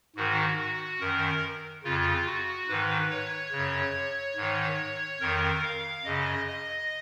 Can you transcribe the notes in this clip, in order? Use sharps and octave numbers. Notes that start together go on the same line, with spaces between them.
G#2 D#3 F#4
F#4
F#2 D#3 A#4
F2 C#3 F4
F#4
G#2 D#3 B4
C#5
F#2 C#3
G#2 D#3
F2 D#3 A#4
F5
F#2 C#3 D#5
D#5